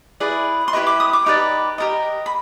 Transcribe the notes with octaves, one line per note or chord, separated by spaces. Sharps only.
E4 G#4 B4 D5
C6
E4 G4 B4 D#5 C#6
D6
D#6
D6
D#4 G4 B4 D5 D6
G4 A#4 D#5
B5